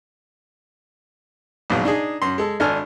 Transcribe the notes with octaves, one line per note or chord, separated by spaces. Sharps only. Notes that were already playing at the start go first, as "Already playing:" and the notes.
A#1 G#2 B2 F#3
D4 D#4 G#4
F#2 C6
G#3 A4
G#1 D4 A4 G#5 F6